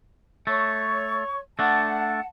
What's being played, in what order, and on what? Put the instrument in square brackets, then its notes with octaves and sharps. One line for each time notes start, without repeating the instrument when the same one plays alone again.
[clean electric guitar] A3 [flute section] C#5 C#6
[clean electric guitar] A3 D4 [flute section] F#5 A5